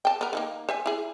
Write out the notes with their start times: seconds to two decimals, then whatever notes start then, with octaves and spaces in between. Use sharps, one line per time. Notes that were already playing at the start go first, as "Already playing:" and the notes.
0.05 G5 A5
0.21 B3 A#4
0.33 D#3 F3 A#3
0.69 C5 E5 G#5
0.86 E4 G#4